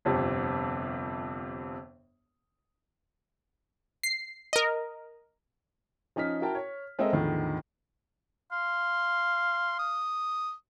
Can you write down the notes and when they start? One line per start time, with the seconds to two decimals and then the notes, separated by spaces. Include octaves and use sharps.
0.05 G1 F2 C3
4.03 C7
4.53 A#4 D#5
6.16 F3 C#4 D#4 F6 B6
6.41 E4 F#4 A#4 G5 A5
6.55 C#5
6.99 G#3 C4 A4 A#4 D#5 E5
7.13 E2 A2 D3 D#3 F3
8.52 F5 C6
9.79 D#6